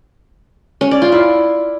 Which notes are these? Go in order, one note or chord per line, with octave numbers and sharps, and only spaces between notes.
C#4
D5
F4
E4